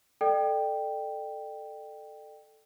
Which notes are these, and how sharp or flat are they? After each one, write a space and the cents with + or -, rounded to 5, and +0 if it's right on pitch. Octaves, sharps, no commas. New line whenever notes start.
A4 +0 D5 +40 G5 +0